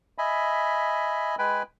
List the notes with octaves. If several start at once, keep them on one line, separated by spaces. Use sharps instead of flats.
D#5 E5 G#5 B5
G#3 B4 G5 G#5 B5